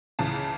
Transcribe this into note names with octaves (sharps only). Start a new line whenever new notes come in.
C#2 C#3 E3 A5